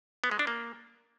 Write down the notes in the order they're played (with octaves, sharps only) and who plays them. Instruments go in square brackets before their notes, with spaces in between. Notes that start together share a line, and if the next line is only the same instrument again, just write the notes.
[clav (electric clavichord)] B3
G#3
D4
A#3